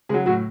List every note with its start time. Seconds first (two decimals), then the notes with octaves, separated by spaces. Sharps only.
0.09 C#3 G#3 G#4
0.14 F#3
0.26 A2 F#3 F#4